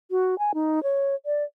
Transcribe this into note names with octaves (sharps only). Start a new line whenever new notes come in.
F#4
G#5
D#4
C#5
D5